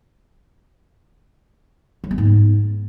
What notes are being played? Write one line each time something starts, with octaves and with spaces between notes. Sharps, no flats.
F#3
B3
G#2